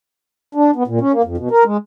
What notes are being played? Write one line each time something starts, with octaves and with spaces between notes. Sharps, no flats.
D4
B3
A#2
C#4
A#3
F2
B2
A#4
G#3